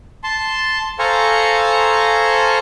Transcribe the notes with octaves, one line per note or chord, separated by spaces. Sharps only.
A5 C6
A4 C5 F5 G#5 A#5 C#6